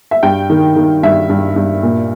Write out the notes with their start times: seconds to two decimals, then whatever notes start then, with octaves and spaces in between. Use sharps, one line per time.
0.11 E5
0.23 G2 G5
0.50 D#3
0.76 D#3
1.03 G2 E5
1.29 G2
1.56 G2
1.83 A#2